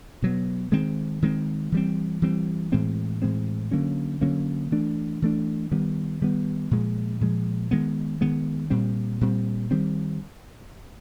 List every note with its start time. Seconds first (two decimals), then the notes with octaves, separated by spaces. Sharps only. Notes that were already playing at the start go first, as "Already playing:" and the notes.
0.22 B2 F#3 B3
0.72 D#3 G#3 C4
1.22 D#3 G#3 C4
1.72 E3 G3 C4
2.22 E3 G3 C4
2.72 A2 E3 G#3 C4
3.22 A2 E3 G#3 C4
3.71 D3 F#3 A#3 C#4
4.21 D3 F#3 A#3 C#4
4.72 E3 A3 D4
5.22 E3 A3 D4
5.72 D#3 G3 B3
6.21 D#3 G3 B3
6.71 A#2 F3 G#3
7.21 A#2 F3 G#3
7.71 D#3 G#3 B3
8.21 D#3 G#3 B3
8.70 A#2 G3 C4
9.21 A#2 G3 C4
9.71 D#3 G3 C4